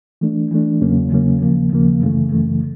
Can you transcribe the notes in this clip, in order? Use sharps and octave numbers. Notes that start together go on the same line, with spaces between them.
E3 A3 D4
E3 A3 D4
E2 C#3 F#3 A#3 C#4
E2 C#3 F#3 A#3 C#4
D#2 C#3 F3 A#3
D#2 C#3 F3 A#3
F#2 C#3 E3 A3
F#2 C#3 E3 A3